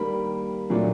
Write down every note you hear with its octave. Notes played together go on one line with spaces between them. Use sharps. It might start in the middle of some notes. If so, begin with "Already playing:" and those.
Already playing: D#3 G3 A#3 B5
A#2 F#3 A3 D4